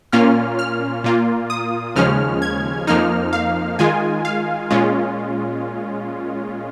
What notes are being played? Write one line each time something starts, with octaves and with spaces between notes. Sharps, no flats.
A#2 A#3 C#4 F4 F6
F6
A#2 A#3 F4
D#6
D#2 C#3 F3 G#3 C#4 F6
G#6
F2 F3 A#3 D#4 F6
F5
D#3 G#3 F4 G#5
F5
A#2 G#3 C#4 F4